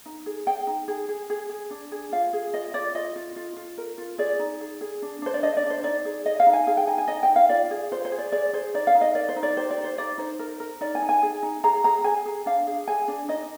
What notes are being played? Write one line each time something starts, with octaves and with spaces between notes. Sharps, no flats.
D#4
G#4
G#4 G5
D#4
G#4
G#4
G#4
G#4
D4
G#4
F4 F5
G#4
F4 D#5
F4 D5
F4 D#5
F4
F4
F4
A#4
F4
G#4 D5
D#4
G#4
G#4
D4
D4 C5
D5
D4 D#5
D5
D4
C5
D#4 D5
G#4
G#4 D#5
F5
D#4
G#5
G#4 F5
G5
D#4 G#5
G#5
D#4 D#5
G5
D#4
F5
F4 D5
G#4
F4 C5
C5
G#4
D5
G#4 D5
G#4 C5
D#4 D5
F5
D#4
D#5
A#4 D5
C5
D#4
D5
G4 C5
D5
D#4
C5
D#4 D5
D#4 C5
A#4
A#4
D#4 D5
G#5
D#4
G#5
G#4
D#4
G#4 A#5
G#4 A#5
G#4 G#5
G#4
D4 F5
G#4
G#4 G#5
D4
D#4 D#5